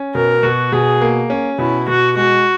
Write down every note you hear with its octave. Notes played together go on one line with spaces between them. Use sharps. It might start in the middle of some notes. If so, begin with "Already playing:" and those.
Already playing: C#4
B2 A#4
B2 F#4
B2 G#4
A#3
C#4
B2 E4
B2 F#4
G#3 F#4